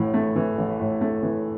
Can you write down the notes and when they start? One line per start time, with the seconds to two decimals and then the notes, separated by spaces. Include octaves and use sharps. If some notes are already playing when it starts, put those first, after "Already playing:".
Already playing: A1 A2 E3
0.14 A3
0.36 E3
0.58 A1
0.80 A2
1.01 A3
1.23 E3